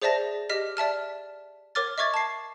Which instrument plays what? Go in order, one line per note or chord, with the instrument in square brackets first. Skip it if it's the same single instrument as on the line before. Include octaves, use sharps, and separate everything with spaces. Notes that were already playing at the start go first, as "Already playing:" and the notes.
[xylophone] G#4 C5 D5 E5 A5 A#6
G4 D#5 F6 B6
D5 E5 A5 F6
A#4 C#5 D6 F6 A6
D#5 E5 C#6 D6 G#6 A6
A5 C7